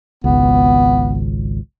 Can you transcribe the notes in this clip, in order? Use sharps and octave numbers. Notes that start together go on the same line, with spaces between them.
G#1 C#2 B3